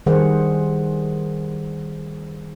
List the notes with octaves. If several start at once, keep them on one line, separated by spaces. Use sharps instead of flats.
D#3 G3 G#4 C5 F#5